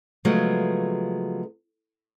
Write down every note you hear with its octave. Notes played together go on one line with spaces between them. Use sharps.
C#3 F3 F#3 G#3 A3 B3